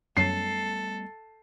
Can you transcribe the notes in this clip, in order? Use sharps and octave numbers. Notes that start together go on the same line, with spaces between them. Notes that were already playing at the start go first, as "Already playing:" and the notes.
F#2 F#3 G3 A3 B3 A4 C7